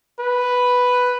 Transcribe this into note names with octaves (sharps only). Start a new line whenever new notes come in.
B4